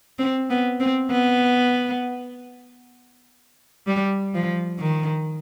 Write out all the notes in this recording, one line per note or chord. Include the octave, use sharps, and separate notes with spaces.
C4
B3
C4
B3
G3
F3
D#3